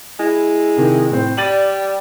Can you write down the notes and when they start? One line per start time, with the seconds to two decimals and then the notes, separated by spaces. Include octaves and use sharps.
0.20 G#3 E4
0.77 C3 D#3
1.11 A2 C4
1.37 G3 D5 A6 D#7 F#7